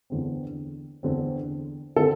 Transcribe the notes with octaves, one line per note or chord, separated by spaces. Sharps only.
E2 D3 C4
E2 D3 C4
D3 C4 A4